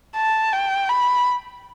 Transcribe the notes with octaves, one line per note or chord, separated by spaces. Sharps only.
A5
G5
B5